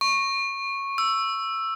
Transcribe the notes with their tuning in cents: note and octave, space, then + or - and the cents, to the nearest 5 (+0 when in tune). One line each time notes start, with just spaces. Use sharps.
C#6 -10
E6 +5